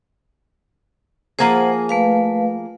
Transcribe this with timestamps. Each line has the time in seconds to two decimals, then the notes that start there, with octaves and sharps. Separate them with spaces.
1.39 F3 A#3 G#4 C5 F#5
1.89 A3 B4 F5